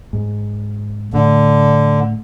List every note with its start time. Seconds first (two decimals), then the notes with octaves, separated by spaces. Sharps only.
0.13 G#2
1.13 A2 D3